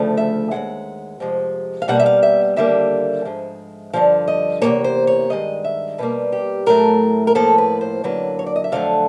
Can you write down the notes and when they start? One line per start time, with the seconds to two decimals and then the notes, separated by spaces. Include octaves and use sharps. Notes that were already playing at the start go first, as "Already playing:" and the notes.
Already playing: D2 C#3 F3 A3
0.17 E5
0.51 D#2 D#3 G#3 F#5
1.20 F2 C3 F3 G#3
1.82 F5
1.88 B2 G3 A#3 F#5
1.99 E5
2.06 F5
2.23 E5
2.56 D#2 D3 G3 A#3 E5
3.25 G#2 F3 G#3
3.93 G2 D3 F3 F5
4.28 D#5
4.62 E2 C3 D#3 F#3 A#3 C#5
4.84 C5
5.07 C#5
5.30 G2 D#3 G#3 D#5
5.64 E5
5.98 B2 G3 A#3 B4
6.32 G4
6.66 A2 F#3 A3 A#4
7.27 A#4
7.35 A2 F3 A#3 A4
7.58 B4
7.81 C5
8.04 F#2 D3 F#3 A#3 B4
8.39 C#5
8.47 D5
8.56 D#5
8.64 E5
8.72 F2 D3 F#3 A3 F5